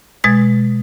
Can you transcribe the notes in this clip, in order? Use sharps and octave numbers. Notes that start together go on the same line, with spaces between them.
B2 G#3 G#6 A6